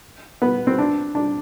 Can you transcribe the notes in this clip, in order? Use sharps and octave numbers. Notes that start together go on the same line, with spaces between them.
B3
C4
D4
D4